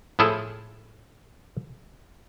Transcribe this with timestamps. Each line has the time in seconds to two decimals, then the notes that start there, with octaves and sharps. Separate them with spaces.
0.19 A2 F3 E4 G#4 A4